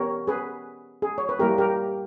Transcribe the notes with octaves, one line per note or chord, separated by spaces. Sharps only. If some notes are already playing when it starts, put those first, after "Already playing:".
Already playing: B3 G4 A#4 C#5
G#4 B4
G#4
C#5
B4
G3 A#3 E4 G4 A#4
G4 A#4